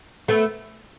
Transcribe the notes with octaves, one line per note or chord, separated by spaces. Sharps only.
A3 B3